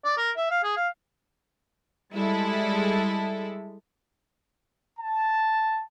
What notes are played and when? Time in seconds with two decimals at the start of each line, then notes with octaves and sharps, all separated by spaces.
0.05 D5
0.18 A#4
0.37 E5
0.50 F5
0.64 G#4
0.77 F5
2.13 G3 G#3 E4 A4
4.99 A5